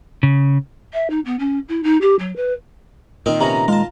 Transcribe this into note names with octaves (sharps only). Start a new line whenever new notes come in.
C#3
E5
D#4
B3
C#4
E4
D#4
G4
F#3
B4
A#2 D#3 C4 D#4 A#4
C3 B3 C#4 A#5
G#3 F4 A5